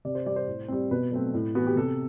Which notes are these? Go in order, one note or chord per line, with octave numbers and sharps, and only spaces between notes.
C3 D5
C5
G3 C4 D5
C5
A2
G3 C4
B2 B4
F#3 A3 C4
A2
E3 B3 F#4
G4
C3 A4